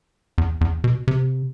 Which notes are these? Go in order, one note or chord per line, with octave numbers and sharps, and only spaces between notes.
E2
E2
B2
C3